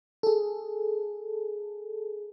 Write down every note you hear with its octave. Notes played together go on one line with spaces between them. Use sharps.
G#4 A4